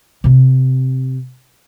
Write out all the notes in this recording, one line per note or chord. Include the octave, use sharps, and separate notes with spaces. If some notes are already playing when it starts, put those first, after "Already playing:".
C3 C4